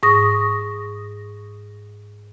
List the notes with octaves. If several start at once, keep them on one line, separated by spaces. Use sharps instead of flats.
G#2 C#6 D#6 A#6